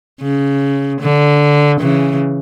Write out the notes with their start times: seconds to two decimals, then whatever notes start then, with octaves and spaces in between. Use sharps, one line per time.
0.21 C#3
1.01 D3
1.80 C#3 E3